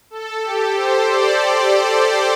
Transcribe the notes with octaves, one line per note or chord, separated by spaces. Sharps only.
A4
G4
C5
D5